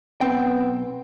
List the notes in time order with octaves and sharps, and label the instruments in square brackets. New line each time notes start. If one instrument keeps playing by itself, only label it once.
[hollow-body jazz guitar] B1 C4 G5 [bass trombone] B3